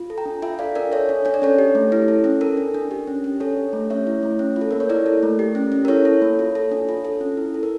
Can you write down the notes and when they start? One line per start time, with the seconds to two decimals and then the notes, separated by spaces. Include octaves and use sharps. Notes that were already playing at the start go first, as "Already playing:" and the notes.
Already playing: F4
0.10 A4
0.18 G5 A#5
0.25 D4
0.42 F4 E5 G5
0.59 A4 D5 F5
0.75 D4 A#4 D5
0.92 A4 C#5 E5
1.09 D4
1.25 D4 C#5
1.34 D5
1.42 C#4 A4 C#5
1.58 G4
1.75 A3
1.92 E4
2.08 A4
2.24 C#4
2.41 A4 A#4
2.57 D4
2.74 D4
2.91 G4
3.07 C#4
3.24 C#4
3.40 D4 A4 C#5
3.57 G4
3.73 A3
3.90 C#4 C#5 E5
4.07 E4
4.23 A3
4.39 C#4
4.56 F4
4.61 A4
4.71 A#3 A#4
4.80 C#5
4.89 E4 A#4 D5
5.06 A4
5.23 A3
5.39 G4
5.55 C#4
5.72 C#4
5.85 A#4
5.88 E4 A4 C#5
6.05 A4
6.22 A#3
6.39 F4
6.55 A4
6.71 D4
6.89 F4
7.05 A4
7.21 C#4
7.37 E4
7.54 A4
7.63 A#4